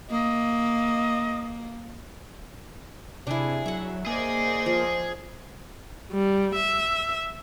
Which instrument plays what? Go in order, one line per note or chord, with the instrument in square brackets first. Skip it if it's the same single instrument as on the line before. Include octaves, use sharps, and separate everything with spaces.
[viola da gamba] A#3 [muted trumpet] D#5
[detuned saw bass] C3 [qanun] D4 E4 [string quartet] G#4
[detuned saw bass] F#3 [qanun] E5 F#5
[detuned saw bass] A#3 [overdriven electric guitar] G#4 [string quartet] C5 D5 D#5
[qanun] F3
[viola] G3
E5